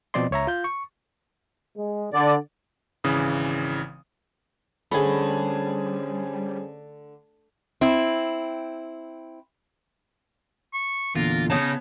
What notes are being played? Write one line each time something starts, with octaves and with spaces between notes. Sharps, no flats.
B2 F3 C4 D5 D#5 C6
C#2 C#5 E5 A#5
F4 G6
C#6
G#3
D3 D5
G#1 C#3 E3 D#6
D3 G3 A3 C#4 G#4 C5 C#5 B5
C4 E4
C#6
E2 A#2 D3 F4 A#4
C#3 B3 D#4 C#5 A5